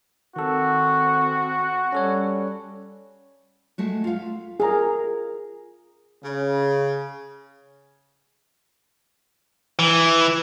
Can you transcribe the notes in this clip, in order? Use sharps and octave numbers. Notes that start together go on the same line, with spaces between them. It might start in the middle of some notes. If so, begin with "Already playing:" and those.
D#3 C4 F#4 A4
G3 C#4 A4 C#5
G#3 A3 F#4
F4 F5
F4 G#4 A#4 A#5
C#3
E3